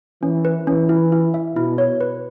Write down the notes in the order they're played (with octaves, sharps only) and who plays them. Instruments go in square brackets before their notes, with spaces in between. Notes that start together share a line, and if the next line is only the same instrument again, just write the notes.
[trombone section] E3 [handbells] C#4
[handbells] B4
[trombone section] E3 [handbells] C#4
[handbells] E4
E4
E5
[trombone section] B2 [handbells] E4
[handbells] C#5
B4